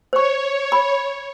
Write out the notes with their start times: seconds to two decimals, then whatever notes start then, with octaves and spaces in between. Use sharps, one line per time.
0.13 C5 C#5 C#6
0.72 B5